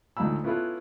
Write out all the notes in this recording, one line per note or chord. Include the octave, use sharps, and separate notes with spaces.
D2 G#2 F3 A5 B5 E6
B3 C#4 E4 F4 A4 B4